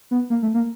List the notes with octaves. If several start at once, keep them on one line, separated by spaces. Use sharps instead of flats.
B3
A#3
A3
A#3